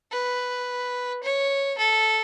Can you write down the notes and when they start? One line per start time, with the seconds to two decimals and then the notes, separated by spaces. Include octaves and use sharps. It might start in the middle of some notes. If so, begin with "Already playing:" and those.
0.12 B4
1.23 C#5
1.78 A4